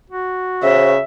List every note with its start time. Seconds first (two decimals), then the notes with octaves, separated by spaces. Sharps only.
0.10 F#4
0.63 C#3 C5 E5